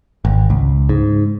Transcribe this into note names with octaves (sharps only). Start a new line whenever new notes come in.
G#1
C#2
G#2